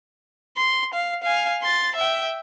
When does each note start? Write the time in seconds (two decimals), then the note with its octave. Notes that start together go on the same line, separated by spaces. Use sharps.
0.57 C6
0.94 F5
1.23 F5 G#5
1.62 C6 A6
1.96 E5 G5